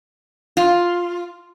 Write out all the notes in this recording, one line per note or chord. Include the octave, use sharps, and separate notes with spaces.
F4